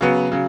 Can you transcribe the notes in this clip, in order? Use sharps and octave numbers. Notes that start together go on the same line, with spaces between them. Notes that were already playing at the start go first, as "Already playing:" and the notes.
C#3 F#3 B3
C#3 F#3